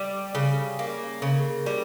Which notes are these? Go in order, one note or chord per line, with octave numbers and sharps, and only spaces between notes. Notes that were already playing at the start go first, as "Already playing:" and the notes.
Already playing: G3
C#3
A#3
C#3
G3